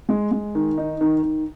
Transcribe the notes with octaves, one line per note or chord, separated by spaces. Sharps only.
G#3
G#3
D#3
D#4
D#3
D#3